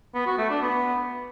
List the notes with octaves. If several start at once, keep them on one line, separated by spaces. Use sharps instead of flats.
B3
F#4
A3
D4
B3